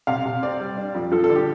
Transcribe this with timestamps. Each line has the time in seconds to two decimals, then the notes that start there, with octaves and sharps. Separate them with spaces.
0.07 C3 F5
0.25 C3
0.42 C4 D5
0.60 G3
0.77 D4
0.95 F2
1.12 F3 A4
1.24 A4
1.29 D3
1.36 G4